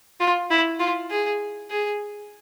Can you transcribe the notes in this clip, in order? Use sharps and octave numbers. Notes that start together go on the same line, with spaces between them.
F4
E4
F4
G#4
G#4